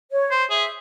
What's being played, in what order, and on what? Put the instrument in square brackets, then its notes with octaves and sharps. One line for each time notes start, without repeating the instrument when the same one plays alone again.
[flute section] C#5
[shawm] C5
[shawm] G#4 [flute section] E5